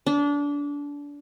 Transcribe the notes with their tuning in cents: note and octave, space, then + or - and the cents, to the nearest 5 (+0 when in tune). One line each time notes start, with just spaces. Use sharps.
D4 -25